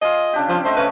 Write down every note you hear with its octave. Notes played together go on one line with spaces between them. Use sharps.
F4 G#4 D#5
C#3 D4 G4
F3 C4
A3 C5 D#5 E5
C#3 A3 C#4 B4